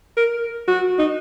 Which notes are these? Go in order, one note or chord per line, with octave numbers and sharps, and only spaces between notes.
A#4
F#4
D#4